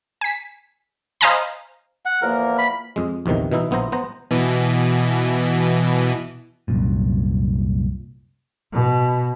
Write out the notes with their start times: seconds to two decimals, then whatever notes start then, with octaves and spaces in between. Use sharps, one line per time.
0.21 G#5 B6
1.21 C5 D#5 F5 G#5 A#5 B5
2.05 F#5
2.22 E2 F3 A#3 A#4
2.58 B5
2.96 F2 G#3
3.26 A#1 E2 C3 D#3 E3
3.51 B2 E3 D#4 E4
3.71 A#1 B3 E4 C5 A#5
3.92 B3 C5 A#5
4.31 B2 E3
6.68 C2 F#2 A#2
8.73 B2